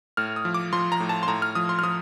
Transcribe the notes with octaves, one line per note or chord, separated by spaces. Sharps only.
A2 F6
D#6
F3
D6
F3 C6
A#5
A2
A5
C6
A2 A#5
F6
F3 D#6
C6
F6
F3 D#6